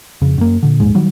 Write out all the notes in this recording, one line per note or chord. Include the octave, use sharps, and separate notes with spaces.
F2 C#3
F#2 A#3
A#2 D3
A#1 D#2 G#2 G#3
D#3 F#3 G3